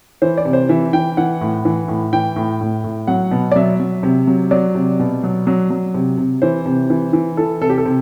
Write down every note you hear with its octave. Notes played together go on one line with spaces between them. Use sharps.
E3 C5
D5
C3
C5
E3 E5
E3 G5
E3 F#5
A2
E3
A2
E3 G5
A2
A2
A2
F#3 F#5
B2
D5
F#3 E5
F#3
C3
F#3
F#3 D5
C3
B2
F#3
F#3
F#3
C3
C3
E3 C5
C3
E3
E3
E3 A4
C3 A4
G4
A4
C3